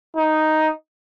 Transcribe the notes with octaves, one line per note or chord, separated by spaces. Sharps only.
D#4